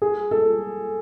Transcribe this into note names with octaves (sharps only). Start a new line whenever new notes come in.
G#4
A4